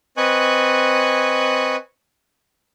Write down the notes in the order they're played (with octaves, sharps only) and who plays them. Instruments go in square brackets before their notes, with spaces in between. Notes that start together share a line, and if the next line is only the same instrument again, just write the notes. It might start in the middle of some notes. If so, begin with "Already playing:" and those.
[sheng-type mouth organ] C4 B4 D#5 G#5 C#6 F#6